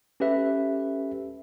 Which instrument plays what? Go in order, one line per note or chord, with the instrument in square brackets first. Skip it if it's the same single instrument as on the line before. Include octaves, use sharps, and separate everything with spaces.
[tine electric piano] C#4 G4 A4 B4 E5